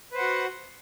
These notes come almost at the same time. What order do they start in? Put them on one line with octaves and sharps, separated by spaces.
B4 C5 F#5 F#4